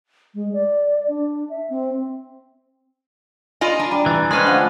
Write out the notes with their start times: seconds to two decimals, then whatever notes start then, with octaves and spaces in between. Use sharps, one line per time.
0.35 G#3
0.53 D5
1.08 D4
1.50 E5
1.70 C4
3.61 F4 D5 D#5 G#5 B5 D#7
3.80 D4 A#5
3.91 G3
4.06 E3 A6
4.31 G#3 C#4 D4 B4 C5 C6 F#6
4.47 D3 F3 A3